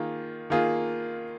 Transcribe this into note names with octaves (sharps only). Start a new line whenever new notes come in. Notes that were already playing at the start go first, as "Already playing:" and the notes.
Already playing: D#3 A#3 F4 G#4
D#3 A#3 F4 G#4